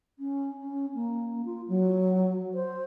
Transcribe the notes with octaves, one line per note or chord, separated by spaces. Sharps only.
C#4
C#4
A#3
F4
F#3
C5